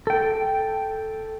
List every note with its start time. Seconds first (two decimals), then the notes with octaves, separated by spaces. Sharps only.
0.07 A4 G5